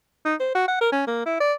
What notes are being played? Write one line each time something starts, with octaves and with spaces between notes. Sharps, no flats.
D#4
C5
F#4
F#5
A#4
C#4
A#3
E4
D5